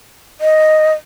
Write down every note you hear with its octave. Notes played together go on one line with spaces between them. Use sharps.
D#5